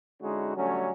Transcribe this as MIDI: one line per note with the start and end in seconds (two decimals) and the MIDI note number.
0.22 0.53 50
0.22 0.53 56
0.22 0.53 61
0.22 0.53 63
0.22 0.53 64
0.22 0.53 66
0.56 0.90 50
0.56 0.90 54
0.56 0.90 55
0.56 0.90 57
0.56 0.90 61